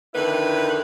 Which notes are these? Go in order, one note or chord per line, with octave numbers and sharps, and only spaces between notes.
F2 D3 D#3 E4 B4